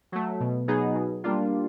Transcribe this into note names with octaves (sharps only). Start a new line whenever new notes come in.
F#3 A3
B2
F#3 B3 D#4 G#4
B2
G3 A#3 D4 F4